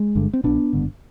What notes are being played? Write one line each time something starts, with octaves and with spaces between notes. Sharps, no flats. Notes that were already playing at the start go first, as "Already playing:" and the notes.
Already playing: G#3
G1 G2 D3
C4
B1 B2 B3 D4
G#1 G2 D3